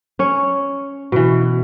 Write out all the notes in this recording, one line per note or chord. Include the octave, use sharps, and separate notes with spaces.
C#4 C#5
B2 E3